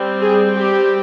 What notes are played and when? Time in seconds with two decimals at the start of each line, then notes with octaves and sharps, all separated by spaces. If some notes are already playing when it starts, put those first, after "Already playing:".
Already playing: G3 C4
0.21 G#4
0.56 G4